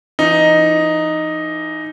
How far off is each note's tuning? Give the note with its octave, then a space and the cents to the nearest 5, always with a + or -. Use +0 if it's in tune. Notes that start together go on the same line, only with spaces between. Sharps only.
E3 +35 D#4 +0